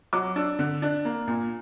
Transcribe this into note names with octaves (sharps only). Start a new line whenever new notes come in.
F#3 D6
D4 E6
D3
D4
A#3
A#2